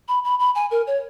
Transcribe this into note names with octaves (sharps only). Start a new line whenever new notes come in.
B5
B5
B5
G#5
A#4
C#5